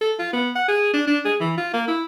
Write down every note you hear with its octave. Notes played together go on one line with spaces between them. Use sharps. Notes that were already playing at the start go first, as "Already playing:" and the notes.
A4
F4
B3
F#5
G#4
D4
D4
G#4
E3
F4
A#3
E4